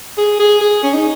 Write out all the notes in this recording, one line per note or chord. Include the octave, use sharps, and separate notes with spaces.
G#4
G#4
G#4
C#4
D#4